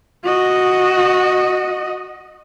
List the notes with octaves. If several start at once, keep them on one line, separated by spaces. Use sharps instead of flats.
F#4 D#5